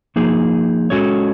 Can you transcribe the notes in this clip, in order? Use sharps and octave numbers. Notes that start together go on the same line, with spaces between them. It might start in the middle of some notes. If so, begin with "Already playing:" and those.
F3 A#3 D#4 G#4
G#3 C#4 F#4 A4 C#5